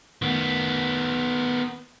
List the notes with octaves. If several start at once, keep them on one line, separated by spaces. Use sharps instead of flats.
D#3 B3